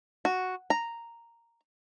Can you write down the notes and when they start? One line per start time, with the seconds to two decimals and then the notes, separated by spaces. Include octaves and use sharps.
0.25 F#4
0.70 A#5